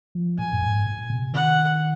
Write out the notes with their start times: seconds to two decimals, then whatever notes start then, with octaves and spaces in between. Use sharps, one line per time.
0.15 F3
0.39 A#2 G#5
0.52 F#2
0.63 G#2
0.86 A#2
1.10 C3
1.33 D#3 F#5